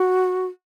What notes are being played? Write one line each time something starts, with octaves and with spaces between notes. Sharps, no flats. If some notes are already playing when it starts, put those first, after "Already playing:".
Already playing: F#4